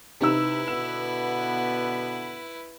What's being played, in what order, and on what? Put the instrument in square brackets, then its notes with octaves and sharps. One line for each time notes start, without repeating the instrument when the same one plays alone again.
[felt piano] C3 D#4 E6 [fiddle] E4 B4
[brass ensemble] B2 D3 B3 [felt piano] E7